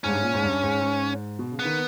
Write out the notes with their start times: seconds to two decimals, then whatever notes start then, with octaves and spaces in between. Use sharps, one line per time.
0.04 G#2 C#4
0.09 G2
0.14 G#2
0.23 A#2
0.33 G#2
0.43 G2
0.62 G#2
0.81 G#2
1.39 B2
1.52 C#3
1.59 B3
1.65 D#3